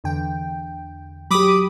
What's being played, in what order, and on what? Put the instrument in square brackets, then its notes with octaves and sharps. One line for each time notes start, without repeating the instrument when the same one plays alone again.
[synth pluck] E2 D3 G5
[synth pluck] F#3 G4 [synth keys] B5 D6 D#6